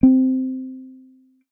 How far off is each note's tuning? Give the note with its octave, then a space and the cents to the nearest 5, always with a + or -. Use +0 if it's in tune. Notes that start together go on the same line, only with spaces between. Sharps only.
C4 -10